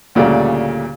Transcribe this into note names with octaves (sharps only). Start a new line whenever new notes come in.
D2 A#2 C#3 G3 A3 D5